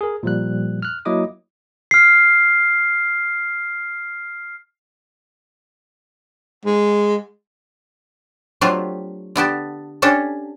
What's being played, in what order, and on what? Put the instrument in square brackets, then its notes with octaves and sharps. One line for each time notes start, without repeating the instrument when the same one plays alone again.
[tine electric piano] G#4 A#4
A#2 F3 G3 F#6
F6 F#6
F#3 A#3 E4 D#5 D6 D#6
[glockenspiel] F6 C7
[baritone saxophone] G#3
[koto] F#3 A3 C4 D4 F4 G4
D3 B3 G4 A5
C#4 D4 G4 A4